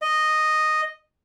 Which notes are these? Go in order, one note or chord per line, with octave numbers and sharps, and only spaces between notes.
D#5